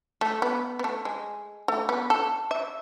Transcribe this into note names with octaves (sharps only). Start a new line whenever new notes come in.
A3
B3
B3
A3
G#3
A3
B3
A4
E5